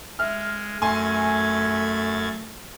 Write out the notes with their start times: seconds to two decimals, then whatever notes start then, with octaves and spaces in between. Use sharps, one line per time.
0.19 G#3 E5 F6
0.82 F#2 A3 G#5 C6 G#6 A6